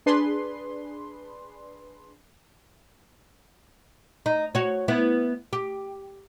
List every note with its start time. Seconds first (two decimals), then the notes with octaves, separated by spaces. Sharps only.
0.06 D4 G#4 B4 C6
4.26 D#4
4.55 F#4 C#5
4.88 B3 E4
5.53 G4